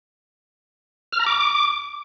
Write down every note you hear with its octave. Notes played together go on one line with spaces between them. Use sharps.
F6
A#5
D6